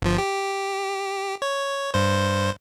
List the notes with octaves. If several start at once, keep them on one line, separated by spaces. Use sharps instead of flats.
G1 F3
G4
C#5
G2 C5